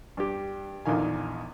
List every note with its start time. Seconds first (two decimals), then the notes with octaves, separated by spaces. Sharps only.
0.17 G2 G4
0.86 A#1 E2 D3 D#3 F5 G#5